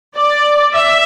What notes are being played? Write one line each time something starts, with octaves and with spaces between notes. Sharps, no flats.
D5
E5